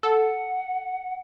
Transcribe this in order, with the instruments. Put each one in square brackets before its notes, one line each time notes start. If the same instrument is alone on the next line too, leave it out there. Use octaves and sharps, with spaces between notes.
[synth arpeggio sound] A4 [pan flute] F#5